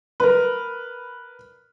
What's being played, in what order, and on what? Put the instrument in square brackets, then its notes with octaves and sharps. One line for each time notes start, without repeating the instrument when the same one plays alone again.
[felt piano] A#4 B4